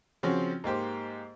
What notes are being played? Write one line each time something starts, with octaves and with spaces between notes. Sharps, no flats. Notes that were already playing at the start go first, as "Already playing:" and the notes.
C#3 F3 C4 C#4 F#4
G#2 A#3 G4 C5